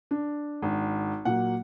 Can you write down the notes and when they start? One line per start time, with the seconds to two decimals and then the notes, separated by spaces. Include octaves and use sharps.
0.11 D4
0.62 G#1
1.25 A#2 F#3 A#3 F#5